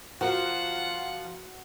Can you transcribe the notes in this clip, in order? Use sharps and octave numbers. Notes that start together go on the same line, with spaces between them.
F3 F4 F#4 A#4 F#5